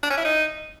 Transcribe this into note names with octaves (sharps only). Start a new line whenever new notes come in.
D4
C#4
E4
D#4